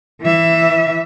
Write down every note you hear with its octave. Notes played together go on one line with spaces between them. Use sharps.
E3 E5